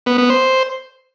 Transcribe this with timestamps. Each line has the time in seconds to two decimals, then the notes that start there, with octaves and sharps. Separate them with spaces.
0.06 B3
0.18 B3
0.30 C5